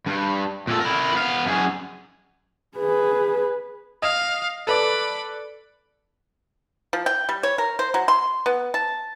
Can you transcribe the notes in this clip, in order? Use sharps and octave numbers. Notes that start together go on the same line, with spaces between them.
G2
A#2 A4
E4 A#4
B3 F5
F#2 G#4
G#4 B4
D#5 F5
A4 B4 D5 B5 D6
F3
G5
G3
C#5
A#4
C5
F#3
C6
B3
A5